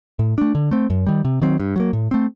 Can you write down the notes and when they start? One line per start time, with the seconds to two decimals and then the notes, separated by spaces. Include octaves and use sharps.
0.19 A2
0.38 A3 D4
0.55 D3
0.71 A3 C4
0.90 F#2
1.07 D#3 G3
1.25 C3
1.42 D#3 F#3 C4
1.60 G2
1.76 F#3 A#3
1.93 A2
2.11 A3 C4